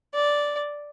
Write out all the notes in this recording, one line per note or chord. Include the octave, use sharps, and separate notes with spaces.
D5